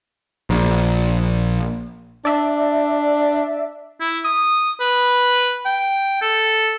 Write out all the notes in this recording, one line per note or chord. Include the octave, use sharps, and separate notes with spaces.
A#1
D4 D5 E5
E4
D#6
B4
G5
A4